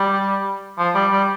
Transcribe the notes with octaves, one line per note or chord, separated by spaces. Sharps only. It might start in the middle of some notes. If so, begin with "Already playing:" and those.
Already playing: G3
F3
G3
G3